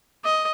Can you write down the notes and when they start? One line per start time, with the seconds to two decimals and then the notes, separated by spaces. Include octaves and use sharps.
0.24 D#5